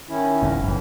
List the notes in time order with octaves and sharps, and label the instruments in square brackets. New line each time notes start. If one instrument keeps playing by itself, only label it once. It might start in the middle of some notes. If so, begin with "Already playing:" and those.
[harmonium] D#3 C#4 E4
[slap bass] F#1 D#2 G#2
[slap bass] F#1 F#2 [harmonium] A2 E3